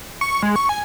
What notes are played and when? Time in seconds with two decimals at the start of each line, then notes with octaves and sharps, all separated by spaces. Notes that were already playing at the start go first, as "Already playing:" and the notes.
0.21 C#6
0.43 G#3
0.56 C#6
0.69 G#5